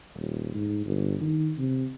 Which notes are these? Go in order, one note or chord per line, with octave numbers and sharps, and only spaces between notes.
D#1
G#2
G1
D#3
C3